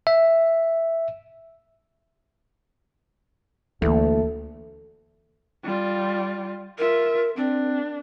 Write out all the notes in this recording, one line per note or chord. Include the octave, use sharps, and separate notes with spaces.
E5
D2 E3 A3 A#3
G3 F4
F4 A#4 E5
C4 D4